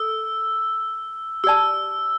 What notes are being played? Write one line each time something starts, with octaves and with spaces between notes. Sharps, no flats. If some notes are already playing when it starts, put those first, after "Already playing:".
Already playing: A4 E6
G4 D5 A5 E6